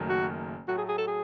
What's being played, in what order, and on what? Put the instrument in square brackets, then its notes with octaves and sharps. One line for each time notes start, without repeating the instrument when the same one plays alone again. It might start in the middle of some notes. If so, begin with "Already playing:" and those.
Already playing: [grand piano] F#1 F#2 D#3 A3
[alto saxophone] F#4
[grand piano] A2 F#3 A3 [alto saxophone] F#4
[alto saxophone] G#4
G#4
A4
G#4